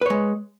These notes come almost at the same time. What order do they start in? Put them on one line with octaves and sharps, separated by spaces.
B4 C#5 G#3